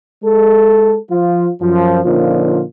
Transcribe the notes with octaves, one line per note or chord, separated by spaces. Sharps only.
G#3 A4
F3 F4
F#2 F3
A#2 D3 F3 C#4 D#4 F4